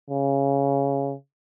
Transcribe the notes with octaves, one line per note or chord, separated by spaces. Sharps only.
C#3